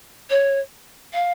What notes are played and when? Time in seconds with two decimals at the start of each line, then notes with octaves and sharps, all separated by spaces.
0.29 C#5
1.13 F5